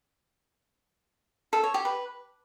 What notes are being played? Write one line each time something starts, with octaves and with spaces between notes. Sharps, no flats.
A4
C#5
G4
B4